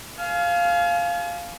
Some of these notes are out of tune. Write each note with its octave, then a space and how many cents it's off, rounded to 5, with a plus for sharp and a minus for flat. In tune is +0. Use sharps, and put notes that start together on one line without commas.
F5 -5 G#5 +40